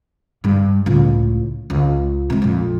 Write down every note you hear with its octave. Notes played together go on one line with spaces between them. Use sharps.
G2 G3
C#2 A2
C#2
C3 G#3
A#1 F2